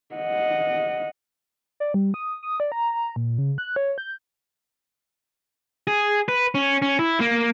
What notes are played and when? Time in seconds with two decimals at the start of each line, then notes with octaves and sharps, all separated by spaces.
0.15 D#5 F#5
1.80 D5
1.94 G3
2.14 D#6
2.43 D#6
2.60 D5
2.72 A#5
3.16 A#2
3.38 C#3
3.58 F#6
3.76 C#5
3.98 G6
5.87 G#4
6.28 B4
6.55 C#4
6.82 C#4
6.99 E4
7.20 A#3